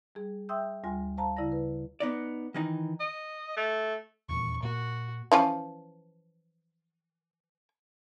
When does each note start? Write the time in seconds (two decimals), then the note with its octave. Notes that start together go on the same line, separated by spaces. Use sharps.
0.15 G3 G#4
0.49 E5 G5 C6 D#6 E6 G6
0.84 D2 G3 F4 G#5 C6
1.18 C5 F5 A5 A#5
1.37 C#3 E4 D5 A#6
1.52 B4
2.00 B3 D#4 D5
2.54 D#3 E3 D#4
3.00 D#5
3.57 A3
4.29 D#1 E2 A#2 C#6
4.63 A#2 A#3 F#4
5.32 E3 F3 C#4